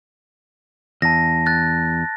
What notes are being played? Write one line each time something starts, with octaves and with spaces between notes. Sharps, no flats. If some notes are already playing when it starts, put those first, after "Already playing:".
E2 A5 A#6
F#6 A6